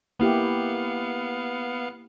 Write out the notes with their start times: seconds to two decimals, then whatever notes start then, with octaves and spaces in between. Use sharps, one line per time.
0.19 A#3 B3 E4 G4 F5 C#7